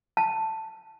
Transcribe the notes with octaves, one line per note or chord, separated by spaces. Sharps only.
A5